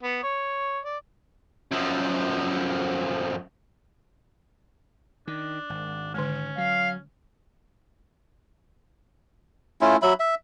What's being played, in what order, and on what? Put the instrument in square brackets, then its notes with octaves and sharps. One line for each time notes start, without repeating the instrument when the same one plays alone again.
[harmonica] B3
C#5
D5
[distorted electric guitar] F#2 F3
[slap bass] D#3 [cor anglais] D4
[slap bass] G#1
[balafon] D3 G#3 [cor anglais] C#4
[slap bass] F#3 [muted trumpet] F5
[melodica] A3 C#4 E4 F4
F#3 E5 B5
E5